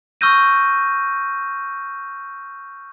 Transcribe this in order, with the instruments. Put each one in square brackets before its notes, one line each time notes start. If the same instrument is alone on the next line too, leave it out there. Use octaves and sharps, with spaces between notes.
[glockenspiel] C#6 E6 F6 G6 A#6 D#7